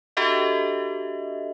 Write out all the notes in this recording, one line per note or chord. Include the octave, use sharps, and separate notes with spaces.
D4 F#4 G4 A4 D#5 E5